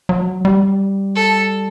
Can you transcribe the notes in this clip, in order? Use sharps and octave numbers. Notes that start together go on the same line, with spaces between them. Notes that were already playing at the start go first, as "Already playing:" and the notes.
F#3
G3
A4